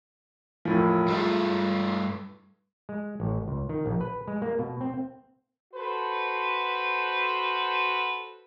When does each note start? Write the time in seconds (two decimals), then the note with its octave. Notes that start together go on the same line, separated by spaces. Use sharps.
0.65 E1 A2 F3
1.08 G2 G#3 A3 E4 F4
2.89 G#3
3.20 A1
3.48 C#2
3.69 D#3
3.86 A#1
4.01 B4
4.28 G#3
4.42 A#3
4.59 B2
4.81 C4
5.74 F#4 A4 B4 C5